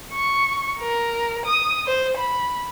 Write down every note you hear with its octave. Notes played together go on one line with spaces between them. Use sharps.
C#6
A#4
D#6
C5
B5